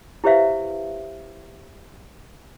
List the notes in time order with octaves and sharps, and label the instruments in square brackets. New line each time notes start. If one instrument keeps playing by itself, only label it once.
[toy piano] E4 G4 B4 C5 E5 F5